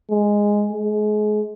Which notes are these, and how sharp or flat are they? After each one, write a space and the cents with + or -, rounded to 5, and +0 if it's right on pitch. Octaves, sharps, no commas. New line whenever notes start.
G#3 -5
G#3 +30